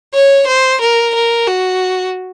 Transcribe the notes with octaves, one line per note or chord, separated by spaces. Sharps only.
C#5
C5
A#4
A#4
F#4